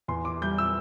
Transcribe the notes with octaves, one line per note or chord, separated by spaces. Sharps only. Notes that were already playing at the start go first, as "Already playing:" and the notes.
E2 C6
D6
G3 G6
E6